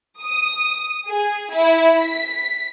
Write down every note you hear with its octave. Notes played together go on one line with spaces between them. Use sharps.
D#6
G#4
E4
B6